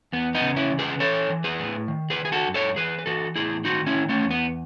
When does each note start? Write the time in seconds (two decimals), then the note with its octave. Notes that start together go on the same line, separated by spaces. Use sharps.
0.13 E2 B3
0.35 B3 D#4
0.42 C#3
0.56 C#4 E4
0.72 E3
0.79 G#4 B4
1.00 E3 A4 C#5
1.30 E3
1.44 G#4 B4
1.59 A2
1.88 D#3
2.10 G#4 B4
2.18 D#3
2.25 G#4
2.32 F#4 A4
2.48 F#2
2.54 A4 C#5
2.76 E3 G#4 B4
2.98 B4
3.06 E3 F#4 A4
3.36 A2 E4 G#4
3.65 D#3 D#4 F#4
3.86 C#4 E4
3.94 D#3
4.09 A3 C#4
4.24 E2
4.31 B3